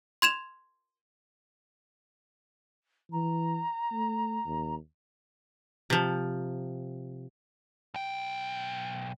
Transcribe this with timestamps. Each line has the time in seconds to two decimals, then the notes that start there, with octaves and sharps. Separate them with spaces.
0.22 C6 G#6 E7 F7
3.12 E3 A#5
3.92 A3
4.45 D#2
5.90 C3 F3
7.94 B1 G5